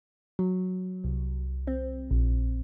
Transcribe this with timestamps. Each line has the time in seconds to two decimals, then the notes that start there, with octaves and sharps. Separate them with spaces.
0.39 F#3
1.04 C2
1.67 C4
2.11 A#1